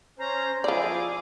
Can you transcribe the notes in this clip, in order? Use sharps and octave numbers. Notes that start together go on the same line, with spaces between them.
C#4 C5 A#5
F3 E4 F4 G#4 D5 D6